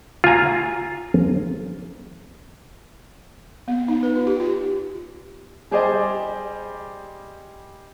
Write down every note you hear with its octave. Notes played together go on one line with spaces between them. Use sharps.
F4 F5 G#5 A#5
B3
D#4
B4
F4
G4
F4
G3 G4 G#4 C5 D5 D#5